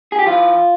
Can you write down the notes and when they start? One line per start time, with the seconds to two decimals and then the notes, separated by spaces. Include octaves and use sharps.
0.12 G#4
0.19 G4
0.26 E3 F4